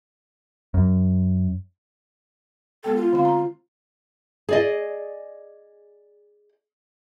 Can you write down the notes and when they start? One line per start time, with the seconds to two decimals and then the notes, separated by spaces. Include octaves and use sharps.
0.74 F#2
2.84 G#3 B3 A4 G5
2.96 F4
3.13 D3 C4 F5
3.25 A#5
4.49 G#4 D5 D#5